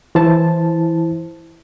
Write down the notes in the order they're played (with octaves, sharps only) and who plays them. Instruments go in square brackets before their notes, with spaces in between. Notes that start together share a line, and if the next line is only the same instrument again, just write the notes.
[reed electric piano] E3 E4 C5 A5